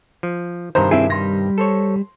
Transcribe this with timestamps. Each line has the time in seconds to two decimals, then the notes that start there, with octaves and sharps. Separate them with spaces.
0.23 F3
0.75 G2 C3 D#3 C5 A#5
0.91 C4 E4 G#4 E5
1.10 G3 C6 A#6
1.58 A4 C5 C#5